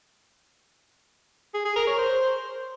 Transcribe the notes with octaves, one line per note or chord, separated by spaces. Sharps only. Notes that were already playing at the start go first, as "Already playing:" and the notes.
G#4
G#4
A#4
C#5
C5